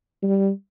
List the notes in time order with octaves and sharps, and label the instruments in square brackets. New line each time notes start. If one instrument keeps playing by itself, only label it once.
[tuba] G3